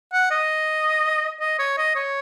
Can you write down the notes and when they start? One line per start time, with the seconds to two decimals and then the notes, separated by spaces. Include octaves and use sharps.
0.13 F#5
0.31 D#5
1.40 D#5
1.59 C#5
1.78 D#5
1.95 C#5